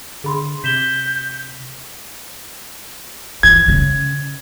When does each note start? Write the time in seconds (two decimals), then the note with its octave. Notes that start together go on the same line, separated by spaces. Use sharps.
0.24 D3 G#4 B5 C6
0.64 C3 G6 B6 E7 G7
3.43 E3 G#6
3.68 C#3